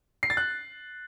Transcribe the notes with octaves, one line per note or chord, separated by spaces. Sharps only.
C7
A6
F#6